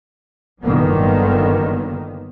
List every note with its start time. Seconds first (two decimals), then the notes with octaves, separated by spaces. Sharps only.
0.63 G1 D3 D#3 F#3 A#3 B3